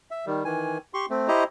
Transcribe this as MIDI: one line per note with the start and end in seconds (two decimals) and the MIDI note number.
0.11 0.26 76
0.26 0.44 51
0.26 0.44 55
0.45 0.78 51
0.45 0.78 52
0.45 0.78 80
0.94 1.06 67
0.94 1.06 84
0.94 1.06 85
1.10 1.28 57
1.10 1.28 60
1.28 1.44 64
1.28 1.44 67
1.28 1.44 72
1.28 1.44 75
1.28 1.44 82